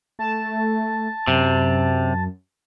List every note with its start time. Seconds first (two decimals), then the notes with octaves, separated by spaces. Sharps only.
0.19 A3 A5
1.28 F#2 C3